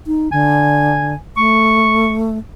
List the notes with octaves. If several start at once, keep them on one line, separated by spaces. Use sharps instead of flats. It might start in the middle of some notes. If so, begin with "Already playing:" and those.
D#4
D3 G#5
A3 C#6